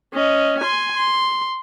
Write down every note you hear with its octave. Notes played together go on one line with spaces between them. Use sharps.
C#4 D#5
G#5 C6
C6